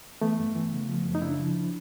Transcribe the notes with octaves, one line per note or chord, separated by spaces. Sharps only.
E3 A3 B3
G2
E3
C#3
F3
F#2
D#4
C#3 D4 E4
F3